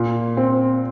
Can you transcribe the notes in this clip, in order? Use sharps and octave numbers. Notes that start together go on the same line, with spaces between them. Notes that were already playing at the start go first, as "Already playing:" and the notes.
Already playing: A#2
C4